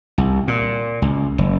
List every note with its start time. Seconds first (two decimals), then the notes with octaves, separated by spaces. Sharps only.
0.18 C2
0.48 A#2
1.02 C#2
1.38 F#1